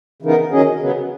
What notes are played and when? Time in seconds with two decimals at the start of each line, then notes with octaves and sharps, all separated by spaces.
0.22 C#3 E3 B3 D#4 A#4
0.51 D#3 F#3 C#4 G#4 D#5
0.80 C#3 F#3 B3